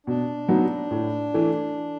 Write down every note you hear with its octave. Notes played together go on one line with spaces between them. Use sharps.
B2 D4
F#3 B3 D#4 F#4
A2
E3 A3